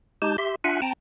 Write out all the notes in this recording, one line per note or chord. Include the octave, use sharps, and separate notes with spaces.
G#3 D#4 G4 A5 G6
G4 E5 C6
D4 F4 E5 F#5 G#5 F#6
C4 G5 A5 A#5